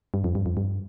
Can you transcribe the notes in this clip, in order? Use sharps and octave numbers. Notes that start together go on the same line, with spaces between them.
G2
F2
G2
F2
G2